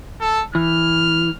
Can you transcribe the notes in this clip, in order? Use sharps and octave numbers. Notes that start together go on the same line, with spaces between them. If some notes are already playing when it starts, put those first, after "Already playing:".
A4
E3 F6